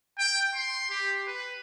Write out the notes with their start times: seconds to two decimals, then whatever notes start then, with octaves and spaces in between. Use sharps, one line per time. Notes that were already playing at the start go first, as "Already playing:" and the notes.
0.19 G5
0.54 C6
0.90 G4
1.27 B4